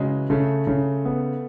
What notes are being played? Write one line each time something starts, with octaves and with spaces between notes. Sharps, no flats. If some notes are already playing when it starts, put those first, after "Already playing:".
Already playing: C#3 E3 F#3 G#3
C#3 A3
C#3
B3